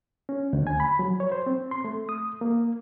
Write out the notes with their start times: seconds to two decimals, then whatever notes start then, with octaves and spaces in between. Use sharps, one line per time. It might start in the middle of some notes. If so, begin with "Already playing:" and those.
0.29 C#4
0.53 D2
0.67 G#5
0.80 B5
0.99 F#3
1.20 C#5
1.32 C5
1.47 C4
1.71 C6
1.85 A3
2.09 D#6
2.41 A#3